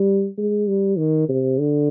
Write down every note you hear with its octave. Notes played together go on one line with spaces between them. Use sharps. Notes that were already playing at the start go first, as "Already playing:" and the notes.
Already playing: G3
G#3
G3
D#3
C3
D3